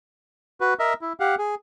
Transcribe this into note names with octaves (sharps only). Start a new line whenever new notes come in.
F#4 B4
A#4 D#5 E5
E4
G4 F5 F#5
G#4